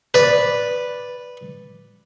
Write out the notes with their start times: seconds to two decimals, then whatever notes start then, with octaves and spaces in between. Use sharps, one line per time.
0.14 B4 D5